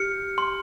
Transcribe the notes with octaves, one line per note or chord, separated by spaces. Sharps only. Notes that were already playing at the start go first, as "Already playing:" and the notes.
Already playing: G4 F6 C#7
C6